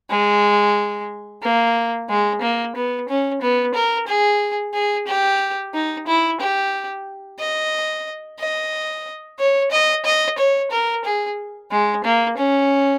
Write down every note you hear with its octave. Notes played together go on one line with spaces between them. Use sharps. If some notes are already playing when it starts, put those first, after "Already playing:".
G#3
A#3
G#3
A#3
B3
C#4
B3
A#4
G#4
G#4
G4
D#4
E4
G4
D#5
D#5
C#5
D#5
D#5
C#5
A#4
G#4
G#3
A#3
C#4